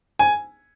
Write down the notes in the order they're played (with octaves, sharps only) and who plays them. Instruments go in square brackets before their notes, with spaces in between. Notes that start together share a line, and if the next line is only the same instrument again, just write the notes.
[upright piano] G#5